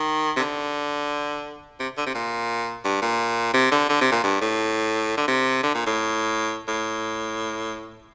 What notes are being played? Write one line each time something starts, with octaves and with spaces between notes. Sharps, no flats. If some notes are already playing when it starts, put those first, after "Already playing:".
Already playing: D#3
C3
D3
C3
D3
C3
A#2
G2
A#2
C3
D3
D3
C3
A#2
G2
A2
D3
C3
D3
A#2
A2
A2